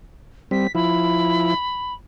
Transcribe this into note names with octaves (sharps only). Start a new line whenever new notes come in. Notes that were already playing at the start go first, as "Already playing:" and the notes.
G3 C4 B6
F3 E4 B5